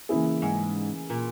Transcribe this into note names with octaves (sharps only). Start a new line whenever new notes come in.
C#3 E3 A#3 E4 G#4
G#2
A#2